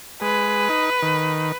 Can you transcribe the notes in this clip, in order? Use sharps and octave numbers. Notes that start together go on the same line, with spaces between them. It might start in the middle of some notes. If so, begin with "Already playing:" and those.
G#3 B4
D#4
D#3